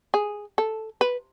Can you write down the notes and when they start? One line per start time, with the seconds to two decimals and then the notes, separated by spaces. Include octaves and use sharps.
0.14 G#4
0.58 A4
1.01 B4